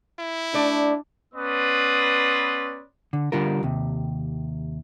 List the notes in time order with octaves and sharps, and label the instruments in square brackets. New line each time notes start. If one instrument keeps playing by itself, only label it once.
[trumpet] E4
[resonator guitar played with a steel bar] A3 D5 [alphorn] D4
[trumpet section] B3 C#4 B4 D5 C6 D#6
[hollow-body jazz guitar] D3
D3 G3 F4 A#4
D#2 C3